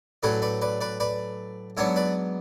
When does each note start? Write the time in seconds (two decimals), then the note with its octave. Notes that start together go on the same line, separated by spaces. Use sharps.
0.23 A2 F#3 A3 C#4 B4 D5
0.42 B4 D5
0.61 B4 D5
0.81 B4 D5
1.00 B4 D5
1.77 G#2 F#3 B3 D4 C#5 E5
1.96 B4 D5